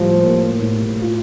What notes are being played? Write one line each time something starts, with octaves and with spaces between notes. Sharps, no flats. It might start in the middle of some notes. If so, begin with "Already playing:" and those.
Already playing: A2 F3 G3
A#3
A2
F4